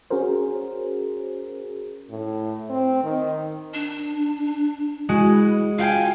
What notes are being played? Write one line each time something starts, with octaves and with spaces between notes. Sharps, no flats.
C#4 F#4 G#4 A#4 C5
A2
C4
D#3
D4
G#3 E4 F#4
F4 F5 G5 G#5